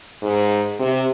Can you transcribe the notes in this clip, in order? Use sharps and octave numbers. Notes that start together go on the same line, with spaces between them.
G#2
C3